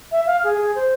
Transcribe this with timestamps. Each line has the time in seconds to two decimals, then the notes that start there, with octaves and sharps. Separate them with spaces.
0.12 E5
0.26 F5
0.44 G#4
0.57 G#4
0.75 C5